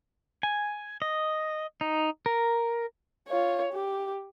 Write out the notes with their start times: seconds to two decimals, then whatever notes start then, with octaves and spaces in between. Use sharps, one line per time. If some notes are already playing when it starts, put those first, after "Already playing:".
0.43 G#5
1.02 D#5
1.81 D#4
2.26 A#4
3.29 F4 C#5
3.73 G4